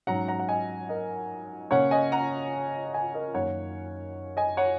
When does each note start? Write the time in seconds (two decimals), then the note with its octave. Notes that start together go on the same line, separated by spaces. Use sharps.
0.07 G#2 F#3 C#4 F#5 A#5
0.28 F#5 A#5
0.39 F#5
0.49 D#5 G#5
0.89 A#4 D#5
1.71 C#3 A#3 C#4 C#5 F#5
1.91 D#5 G#5
2.12 F#5 A#5
2.93 D#5 G#5
3.14 A#4 D#5
3.34 F#2 D#3 A#3 C#4 C#5 F#5
4.37 D#5 G#5
4.57 C#5 F#5